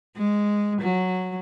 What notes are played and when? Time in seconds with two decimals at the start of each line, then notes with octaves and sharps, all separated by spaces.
0.17 G#3
0.81 F#3